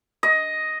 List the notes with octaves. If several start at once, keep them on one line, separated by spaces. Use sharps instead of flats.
D#5